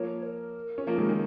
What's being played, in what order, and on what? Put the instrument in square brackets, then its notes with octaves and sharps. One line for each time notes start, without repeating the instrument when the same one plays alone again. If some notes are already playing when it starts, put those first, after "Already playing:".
Already playing: [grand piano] F3 A#3 [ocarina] C#5
[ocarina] A#4
[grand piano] C#4
F3 A#3
D#3 G#3
D#3 G#3